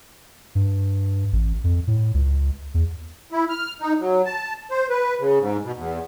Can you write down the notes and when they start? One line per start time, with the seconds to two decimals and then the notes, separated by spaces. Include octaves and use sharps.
0.55 G2
1.33 A1
1.64 F2
1.87 A2
2.14 C#2
2.74 E2
3.31 E4
3.49 F6
3.81 D#4
4.00 F#3
4.25 A5
4.71 C5
4.90 B4
5.20 C#3
5.39 G#2
5.63 B2
5.77 E2